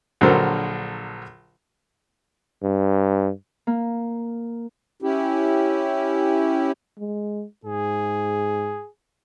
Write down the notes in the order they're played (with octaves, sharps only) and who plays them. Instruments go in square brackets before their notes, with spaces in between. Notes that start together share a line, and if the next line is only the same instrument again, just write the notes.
[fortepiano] A#1 D3 F#3 A4 A#4 C5
[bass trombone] G2
[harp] A#3
[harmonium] C#4 E4 G4
[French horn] G#3
[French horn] G#2 [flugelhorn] G#4